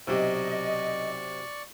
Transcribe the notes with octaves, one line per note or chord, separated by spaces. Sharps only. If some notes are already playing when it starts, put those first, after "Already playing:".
B1 C3 F#3 G4 D5 D#5 C#6 E6